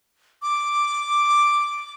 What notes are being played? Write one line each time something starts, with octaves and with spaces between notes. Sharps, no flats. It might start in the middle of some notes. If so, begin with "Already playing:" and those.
D6